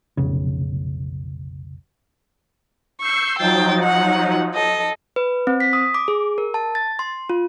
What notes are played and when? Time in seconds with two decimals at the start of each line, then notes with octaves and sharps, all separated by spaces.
0.17 F1 B1 C#3
3.01 C#6 E6 G6 C7
3.39 F3 F#3 D#4 G5 A6
3.83 F#5
4.55 A4 D#5
5.16 B4
5.47 C4
5.60 B6
5.73 D#6
5.94 D6
6.08 G#4
6.38 A#4
6.54 A5
6.75 A6
6.99 C6
7.30 F4